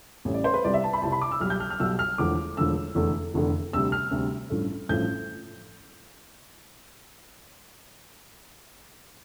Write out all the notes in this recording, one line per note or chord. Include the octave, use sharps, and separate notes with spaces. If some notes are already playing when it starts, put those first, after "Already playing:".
A1 A2 G3
D5
C5
B4
C2 C3 G3 D5
E5
A5
B5
C2 C3 G3 A5
B5
D6
E6
B1 B2 G3 F6
G6
F6
F6
B1 B2 G3 E6
F6
E1 E2 D3 F3 A3 D6
E1 E2 D3 F3 A3 E6
F1 E2 D3 A3
F1 E2 D3 A3
D2 C3 G3 E6
F6
D2 C3 G3
A1 G2 F3 A3
A1 G2 F3 A3 G6